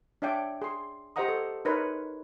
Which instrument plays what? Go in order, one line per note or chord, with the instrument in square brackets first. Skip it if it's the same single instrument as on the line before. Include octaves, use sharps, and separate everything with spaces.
[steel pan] D4 C#5 D5 E5 G5
G#4 C6
G4 C5 D#5 F#5 A#5 D#6
A4
D#4 A#4 B4 C#5 C6